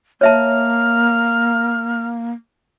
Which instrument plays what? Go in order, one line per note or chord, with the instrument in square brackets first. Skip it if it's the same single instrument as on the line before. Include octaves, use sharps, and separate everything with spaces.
[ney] A#3 [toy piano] C#5 E5 A5 [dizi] F6